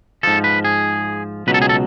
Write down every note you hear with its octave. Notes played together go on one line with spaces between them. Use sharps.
G#2 F3 A4
B4
G#4
C#2 B2 F#3 B4
A4
G#4
A4